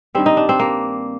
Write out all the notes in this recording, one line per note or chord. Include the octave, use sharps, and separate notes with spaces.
G2 D#3 G3 C4
D#4
D4
C4
A#3